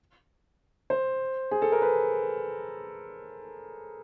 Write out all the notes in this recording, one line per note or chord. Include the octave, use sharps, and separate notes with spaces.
C5
G#4
A4
A#4
B4